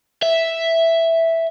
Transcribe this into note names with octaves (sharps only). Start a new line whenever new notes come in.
E5